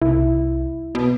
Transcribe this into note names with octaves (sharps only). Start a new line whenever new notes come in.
C2 E4
B2